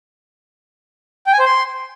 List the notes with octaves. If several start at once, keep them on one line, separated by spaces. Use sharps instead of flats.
G5
G#5
C5
C6